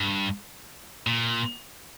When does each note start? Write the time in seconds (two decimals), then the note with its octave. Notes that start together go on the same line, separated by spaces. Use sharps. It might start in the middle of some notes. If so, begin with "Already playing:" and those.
Already playing: G2
1.07 A#2